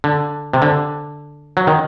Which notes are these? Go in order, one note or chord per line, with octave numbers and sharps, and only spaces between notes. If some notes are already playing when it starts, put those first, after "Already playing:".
D3
C3
D3
F#3
D#3